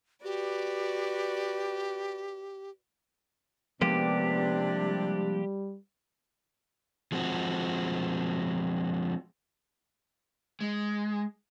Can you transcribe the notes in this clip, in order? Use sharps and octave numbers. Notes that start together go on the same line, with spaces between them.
F#4 G4 B4 D5
C3 F3 G#3 A#3 B3 D4 G4
G3
F3 G#3 C4 F#4
G#3